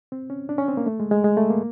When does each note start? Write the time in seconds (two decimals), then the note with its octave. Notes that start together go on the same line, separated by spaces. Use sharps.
0.12 C4
0.30 C#4
0.49 D4
0.58 C#4
0.68 C4
0.77 A#3
0.86 A3
1.00 G#3
1.11 G#3
1.24 G#3
1.37 A3
1.50 A#3